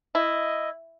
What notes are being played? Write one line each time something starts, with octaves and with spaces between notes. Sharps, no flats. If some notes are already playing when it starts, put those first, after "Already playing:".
E4 D#5